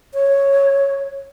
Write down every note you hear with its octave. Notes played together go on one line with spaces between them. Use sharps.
C#5